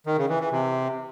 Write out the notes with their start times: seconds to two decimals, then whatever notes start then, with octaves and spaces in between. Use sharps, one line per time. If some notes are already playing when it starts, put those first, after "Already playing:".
0.06 D#3
0.18 C#3
0.29 E3
0.40 E3
0.52 C3